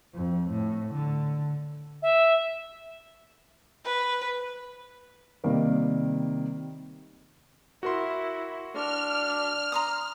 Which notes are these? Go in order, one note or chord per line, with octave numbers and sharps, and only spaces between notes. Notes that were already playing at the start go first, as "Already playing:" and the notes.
F2
A2
D3
E5
B4
C3 D#3 G3 A#3
E4 F#4 A#4 C6
D4 F6
A#5 C6 D#6